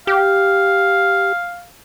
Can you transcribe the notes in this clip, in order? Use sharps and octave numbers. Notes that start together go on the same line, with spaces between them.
G4 F5